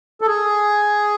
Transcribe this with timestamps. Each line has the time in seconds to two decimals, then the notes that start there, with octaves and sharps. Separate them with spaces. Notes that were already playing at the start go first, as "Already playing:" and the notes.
0.21 A4
0.27 G#4